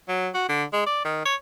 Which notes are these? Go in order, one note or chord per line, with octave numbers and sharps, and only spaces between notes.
F#3
F#4
D3
G#3
D5
D#3
C#5